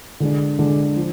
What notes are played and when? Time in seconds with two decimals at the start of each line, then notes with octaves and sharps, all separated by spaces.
0.20 D3 G#3 D4
0.58 D3 G#3 D4
0.96 F3